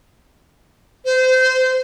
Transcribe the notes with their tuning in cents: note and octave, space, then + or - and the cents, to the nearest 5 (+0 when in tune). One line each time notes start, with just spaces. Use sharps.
C5 -25